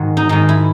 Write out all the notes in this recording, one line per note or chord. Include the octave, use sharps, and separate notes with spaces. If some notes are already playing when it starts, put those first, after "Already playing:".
Already playing: G#2 D#3 G#3 F#4
D#4
G#2 D#3 G#3 D#4
E4